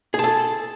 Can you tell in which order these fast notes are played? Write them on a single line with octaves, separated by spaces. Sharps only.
G#4 A5 A4